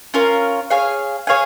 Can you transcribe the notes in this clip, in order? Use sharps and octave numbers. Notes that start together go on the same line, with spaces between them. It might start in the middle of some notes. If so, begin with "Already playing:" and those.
C#4 F4 A#4
G#4 C#5 F5 G#5
G#4 C#5 F5 G#5